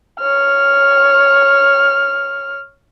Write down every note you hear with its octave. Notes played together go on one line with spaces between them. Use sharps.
C#5 F6